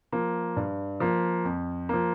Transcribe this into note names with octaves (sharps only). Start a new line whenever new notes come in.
F3 A#3
G2
F3 A#3
F2
F3 A#3